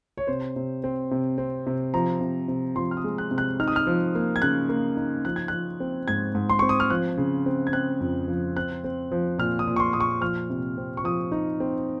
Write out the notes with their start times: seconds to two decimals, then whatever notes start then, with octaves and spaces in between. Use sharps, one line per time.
0.17 C#5
0.27 C3 C5
0.56 C3
0.84 C4
1.11 C3
1.38 C4
1.67 C3
1.94 F3 A#5
2.21 C3
2.48 C3
2.76 F3 C6
2.91 F6
2.97 D#6
3.04 G#3
3.18 F#6
3.31 C3
3.38 F#6
3.60 D#4 F6
3.68 D#6
3.76 F6
3.87 F3
4.15 A#3
4.36 G#6
4.42 C#3 F#6
4.69 A#3
4.97 D#4
5.25 F3 F#6
5.36 G#6
5.48 F3 F#6
5.80 C4
6.08 G#2 G#6
6.35 G#2
6.49 C6
6.59 C4 C#6
6.69 D#6
6.80 F6
6.90 F3 F#6
7.17 C#3
7.46 C4
7.67 G#6
7.73 C4 F#6
8.00 F2
8.28 F3
8.56 C4 F#6
8.84 C4
9.12 F3
9.38 A#2 F6
9.59 D#6
9.67 A#2
9.76 C#6
9.80 C6
9.93 A#2 D#6
10.00 C#6
10.21 F3 F6
10.50 C3
10.78 C4
10.97 C#6
11.04 F3 D#6
11.32 D#4
11.60 C4